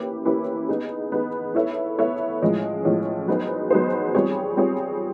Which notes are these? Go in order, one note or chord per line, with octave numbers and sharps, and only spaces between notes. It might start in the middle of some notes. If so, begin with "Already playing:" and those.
Already playing: A#3 C#4 E4 G4 B4
A#3 C#4 E4 G4 B4
B3 D#4 G#4
B3 D#4 G#4
B3 E4 A4 C#5 E5
B3 E4 A4 C#5 E5
A2 F3 G#3 C#4
A2 F3 G#3 C#4
F#3 B3 D#4 G#4 C5
F#3 B3 D#4 G#4 C5
G3 C4 F4 G#4 C#5
G3 C4 F4 G#4 C#5